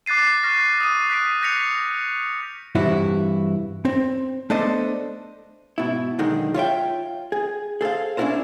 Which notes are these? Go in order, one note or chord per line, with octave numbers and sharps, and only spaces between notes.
D6 F#6 A6 C7 D#7
C#6 F6 A#6
D#6 D#7
F#6 B6 D7
F#6 G6 A#6 B6 C#7 F7
G2 C3 E3 E4 F#4
C4
A3 B3 D4 A4 C5 D#5
G#2 B2 E4
B1 D3 D#3 G#3 D#4 F#5
F4 C#5 E5 G5
G#4
G#4 A4 C5 F5
C#4 D4 E4 F4 A#4 C5